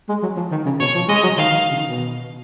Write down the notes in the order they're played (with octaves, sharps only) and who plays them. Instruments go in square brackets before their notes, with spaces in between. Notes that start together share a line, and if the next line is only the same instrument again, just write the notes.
[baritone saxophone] G#3
F#3
F3
D#3
C#3
[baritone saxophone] B2 [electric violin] C#5
[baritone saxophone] F3
[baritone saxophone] G#3 [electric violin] D#5
[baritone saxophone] F#3
[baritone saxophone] D#3 [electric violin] F5
[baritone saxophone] D#3
C#3
D#3
B2